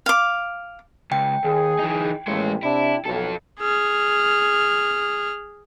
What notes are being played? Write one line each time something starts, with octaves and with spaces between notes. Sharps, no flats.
F5 D6
C#2 G5
D#2 G#4
E3 D#4
A1 D#2 G#3 C#5
C3 D4 E4
B1 F2 A4
G#4 F6